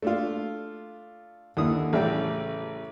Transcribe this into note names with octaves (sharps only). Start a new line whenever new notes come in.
A3 D4 F4
D#2 D3 E4 D#6
A1 C#3 G3 A3 G4 G5